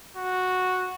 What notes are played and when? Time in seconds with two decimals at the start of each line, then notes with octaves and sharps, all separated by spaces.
0.16 F#4